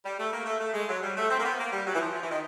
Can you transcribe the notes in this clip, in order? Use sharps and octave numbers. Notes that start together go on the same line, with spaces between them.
G3
A3
A#3
A3
A3
G#3
F#3
G3
A3
C4
A#3
B3
A#3
G3
F#3
E3
F3
F3
E3
D#3